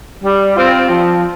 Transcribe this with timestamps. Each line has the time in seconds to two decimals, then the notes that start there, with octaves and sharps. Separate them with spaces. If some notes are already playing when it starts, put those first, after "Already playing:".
0.23 G3
0.56 C4 F4
0.89 F3